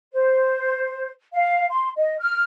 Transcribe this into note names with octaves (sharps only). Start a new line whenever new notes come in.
C5
F5
C6
D#5
F6